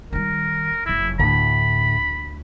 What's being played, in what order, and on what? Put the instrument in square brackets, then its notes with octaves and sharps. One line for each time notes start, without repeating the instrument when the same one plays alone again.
[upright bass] D#3 G3 [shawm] A#4
[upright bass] F#1 F2 [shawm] E4
[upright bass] D2 [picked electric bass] A2 D3 [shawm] B5